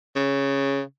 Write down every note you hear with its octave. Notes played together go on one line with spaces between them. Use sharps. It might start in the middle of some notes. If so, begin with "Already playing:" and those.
C#3